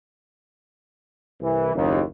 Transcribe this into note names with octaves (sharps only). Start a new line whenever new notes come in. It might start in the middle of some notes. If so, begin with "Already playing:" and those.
C2 E3
F#1 D#2